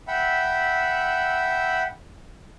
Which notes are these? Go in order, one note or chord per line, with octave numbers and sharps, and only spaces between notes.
E5 F#5 G5 B5 E6